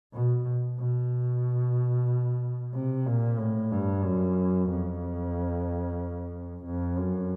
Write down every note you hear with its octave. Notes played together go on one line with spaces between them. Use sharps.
B2
B2
C3
A#2
A2
G2
F#2
F2
F2
F#2